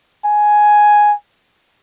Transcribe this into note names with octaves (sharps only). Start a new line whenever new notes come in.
G#5